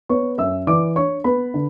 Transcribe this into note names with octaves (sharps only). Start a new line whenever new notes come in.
B3 C#5 C#6
F#2 E5 E6
E3 D5 D6
D4 C#5 C#6
B3 B4 B5
D3